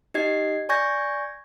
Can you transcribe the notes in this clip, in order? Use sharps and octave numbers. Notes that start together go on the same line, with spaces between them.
D#4 G4 D#5 G#6 C7
D5 G#5 C#6 G6 G#6 A#6